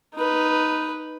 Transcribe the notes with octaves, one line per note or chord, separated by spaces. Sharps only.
D#4 B4